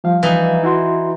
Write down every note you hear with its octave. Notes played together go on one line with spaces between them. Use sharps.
F3 G3 F5
E3 D#4
E4 F#4 C6